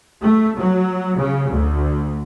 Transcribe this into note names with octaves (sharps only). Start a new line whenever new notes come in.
A3
F#3
C#3
D2